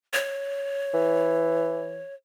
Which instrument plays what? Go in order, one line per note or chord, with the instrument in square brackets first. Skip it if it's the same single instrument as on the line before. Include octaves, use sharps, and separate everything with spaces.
[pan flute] C#5
[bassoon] E3